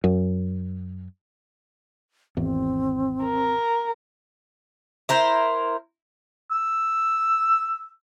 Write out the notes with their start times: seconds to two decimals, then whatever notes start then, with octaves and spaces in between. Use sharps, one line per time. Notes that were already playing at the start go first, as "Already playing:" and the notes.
0.04 F#2
2.37 G#1 E2 C4
3.24 A#4
5.09 E4 A#4 C5
6.51 E6